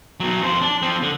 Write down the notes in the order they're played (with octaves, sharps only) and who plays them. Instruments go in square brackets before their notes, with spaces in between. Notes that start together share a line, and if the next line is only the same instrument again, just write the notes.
[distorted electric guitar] B2 F#3
F2 C5
D4
F3 C4
D3